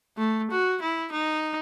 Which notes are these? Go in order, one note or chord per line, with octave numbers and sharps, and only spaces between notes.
A3
F#4
E4
D#4